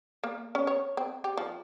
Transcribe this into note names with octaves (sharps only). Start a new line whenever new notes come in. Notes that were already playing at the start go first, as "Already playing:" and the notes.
A#3
C#4
C#5
C4
G4
F3